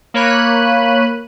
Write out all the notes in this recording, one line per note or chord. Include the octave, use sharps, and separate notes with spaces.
A#3 C#5 B5 F#6 D#7